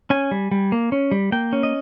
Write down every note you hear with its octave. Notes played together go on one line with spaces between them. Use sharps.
C#4 G#5
G3
G3
A#3
C#4
G3
A#3 G5
C#4
D#5